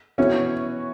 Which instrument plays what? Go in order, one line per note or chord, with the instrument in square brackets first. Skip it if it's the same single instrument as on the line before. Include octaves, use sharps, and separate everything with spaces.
[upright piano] E3 B3 F#4 C#5 E5 [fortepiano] C#4